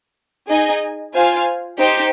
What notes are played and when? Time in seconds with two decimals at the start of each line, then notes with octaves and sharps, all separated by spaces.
0.49 D#4 G#4 D#5 G#5
1.14 F4 C5 F5 G#5
1.78 D#4 G4 C5 G5